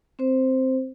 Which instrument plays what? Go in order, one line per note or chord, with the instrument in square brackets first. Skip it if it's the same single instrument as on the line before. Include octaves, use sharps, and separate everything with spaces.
[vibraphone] C4 C5